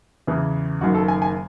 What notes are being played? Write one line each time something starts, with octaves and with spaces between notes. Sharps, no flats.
E2 C#3 E3
F#1 F#2 D#3 F#4
A4
G#5
G#5